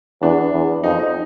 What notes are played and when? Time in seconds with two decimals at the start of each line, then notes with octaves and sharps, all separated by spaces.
0.21 E2 D4
0.53 E2
0.83 F2 D#4
1.00 D#4